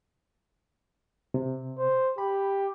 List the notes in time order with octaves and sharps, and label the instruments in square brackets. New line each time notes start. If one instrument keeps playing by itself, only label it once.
[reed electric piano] C3
[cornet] C5
[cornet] G4 [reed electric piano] B5